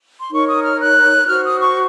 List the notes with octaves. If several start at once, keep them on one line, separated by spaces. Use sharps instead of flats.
C6
D#4 A#4 C#5 C#6
D#6
F6
F#6
F#4 C5 F6
D#6
C#6